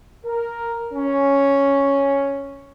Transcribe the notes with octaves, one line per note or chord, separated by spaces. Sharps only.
A#4
C#4